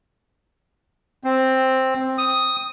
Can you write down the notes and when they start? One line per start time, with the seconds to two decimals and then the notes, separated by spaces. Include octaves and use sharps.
1.24 C4
2.18 D#6